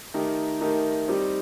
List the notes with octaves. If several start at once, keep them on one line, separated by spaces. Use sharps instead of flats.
D#3 A3 D#4 G4 A#4
D#3 A3 D#4 G4 A#4
G3 C4 D#4 G4